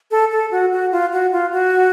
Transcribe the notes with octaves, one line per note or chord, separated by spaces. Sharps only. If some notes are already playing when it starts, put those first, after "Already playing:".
A4
A4
F#4
F#4
F4
F#4
F4
F#4